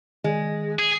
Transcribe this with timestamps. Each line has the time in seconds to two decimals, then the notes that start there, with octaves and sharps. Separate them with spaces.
0.24 D#3 G#3
0.79 G#4